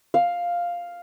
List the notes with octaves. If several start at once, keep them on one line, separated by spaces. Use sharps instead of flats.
F5